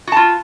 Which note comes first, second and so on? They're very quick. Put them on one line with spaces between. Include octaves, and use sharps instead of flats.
F#4 A5 F4